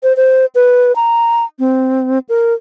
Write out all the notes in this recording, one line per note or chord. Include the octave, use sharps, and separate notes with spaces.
C5
C5
B4
A#5
C4
A#4